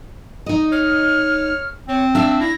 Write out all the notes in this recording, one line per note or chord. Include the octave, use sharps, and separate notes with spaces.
D#4 D#5
C#5 F6
C4 C#5
D4 E5 F5 E6
E4 A#6